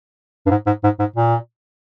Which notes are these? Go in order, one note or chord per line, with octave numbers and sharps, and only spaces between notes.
G2
G#2
G#2
G#2
G#2
A#2